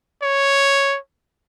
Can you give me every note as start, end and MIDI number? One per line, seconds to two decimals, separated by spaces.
0.22 0.97 73